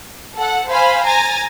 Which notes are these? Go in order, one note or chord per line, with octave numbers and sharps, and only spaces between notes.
A4 F#5
C5 F5 G#5 B5
G#5 A#5 A6